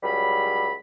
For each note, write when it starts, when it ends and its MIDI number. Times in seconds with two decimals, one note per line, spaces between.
0.03 0.74 37
0.03 0.74 54
0.03 0.74 55
0.03 0.74 83